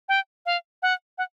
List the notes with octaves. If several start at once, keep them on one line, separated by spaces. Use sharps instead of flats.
G5
F5
F#5
F#5